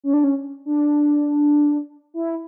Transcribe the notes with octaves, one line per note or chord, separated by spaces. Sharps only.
C#4
D4
C#4
D4
E4